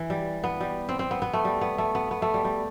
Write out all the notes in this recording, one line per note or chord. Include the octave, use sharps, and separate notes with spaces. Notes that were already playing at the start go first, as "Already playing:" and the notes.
Already playing: E3
G3
B3
G3
C4
C4
B3
B3
A3
G3
B3
A3
B3
B3
A3
G3
G3